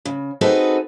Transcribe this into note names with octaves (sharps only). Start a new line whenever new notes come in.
C#3
C4 D#4 F#4 G#4 A4 B4